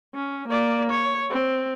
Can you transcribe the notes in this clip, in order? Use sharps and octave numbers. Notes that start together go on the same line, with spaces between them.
C#4
A#3 D5
C#5
C4